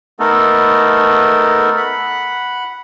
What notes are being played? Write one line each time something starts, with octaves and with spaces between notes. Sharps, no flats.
A3 B3 D#4 A4 A#4
F#5 B5